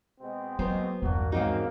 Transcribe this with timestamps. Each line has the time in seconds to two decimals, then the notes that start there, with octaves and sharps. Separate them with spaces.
0.21 B2 G#3 C4
0.59 F#3 A#3 B3 A#4 C5
1.02 B1 E2 G2 D#3 E3 A#3 D4 F#4
1.32 G#2 C#3 A#3 C4 D#4 F#4